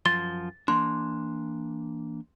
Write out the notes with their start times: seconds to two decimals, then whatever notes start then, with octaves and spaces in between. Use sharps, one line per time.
0.06 F#2 F3 C6 A6
0.68 E3 A#3 D4 C6